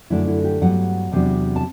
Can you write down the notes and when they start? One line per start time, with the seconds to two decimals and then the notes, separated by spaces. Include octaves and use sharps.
0.10 F#2 D3 A3 D4 E4
0.27 E4
0.44 G4
0.62 G2 F#3 B3 F#5
1.12 E2 C3 F#3 B3 D4
1.56 A5